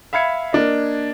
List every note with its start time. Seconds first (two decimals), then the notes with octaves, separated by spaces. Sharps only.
0.13 E5 F5 B5 G#6 C#7
0.53 A#3 D4 D#5